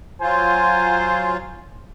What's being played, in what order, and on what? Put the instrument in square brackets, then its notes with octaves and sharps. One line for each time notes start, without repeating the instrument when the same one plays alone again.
[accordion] F#3 F4 [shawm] C5 [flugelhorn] G#5